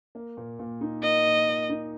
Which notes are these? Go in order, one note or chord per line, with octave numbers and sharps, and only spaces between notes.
A#3
A#2
A#2
D#4
A#3 D#5
A#2
A#2
D#4